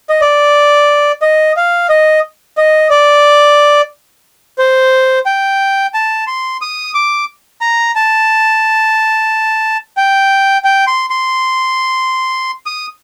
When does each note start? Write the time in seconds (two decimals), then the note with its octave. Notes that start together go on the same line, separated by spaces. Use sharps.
0.10 D#5
0.21 D5
1.22 D#5
1.57 F5
1.90 D#5
2.58 D#5
2.90 D5
4.58 C5
5.26 G5
5.94 A5
6.27 C6
6.61 D#6
6.95 D6
7.61 A#5
7.95 A5
9.97 G5
10.64 G5
10.87 C6
11.10 C6
12.66 D#6